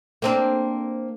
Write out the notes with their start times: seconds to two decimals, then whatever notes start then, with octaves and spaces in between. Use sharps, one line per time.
0.22 A#3 C4 D4